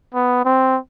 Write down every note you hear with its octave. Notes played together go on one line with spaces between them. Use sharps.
B3
C4